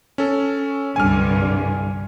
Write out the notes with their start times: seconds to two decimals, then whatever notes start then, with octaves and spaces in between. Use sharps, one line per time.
0.18 C#4 A4
0.96 C2 G2 D3 G#5 F6